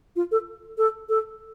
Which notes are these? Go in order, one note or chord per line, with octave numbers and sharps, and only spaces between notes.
F4
A4
A4
A4